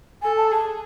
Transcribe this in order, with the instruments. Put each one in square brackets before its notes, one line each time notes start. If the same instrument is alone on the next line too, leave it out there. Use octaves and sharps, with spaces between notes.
[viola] A4 [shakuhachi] G#5
[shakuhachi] A5
[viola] G#4 [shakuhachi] A5